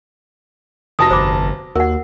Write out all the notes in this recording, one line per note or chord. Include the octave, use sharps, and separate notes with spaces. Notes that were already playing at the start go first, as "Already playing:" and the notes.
F1 F#4 A5 D#6 A#6
G1 C5 B5 D6
D#2 F#4 A#4 F#5